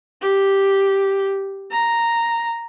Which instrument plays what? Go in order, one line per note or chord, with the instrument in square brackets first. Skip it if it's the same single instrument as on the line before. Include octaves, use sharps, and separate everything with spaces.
[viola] G4
A#5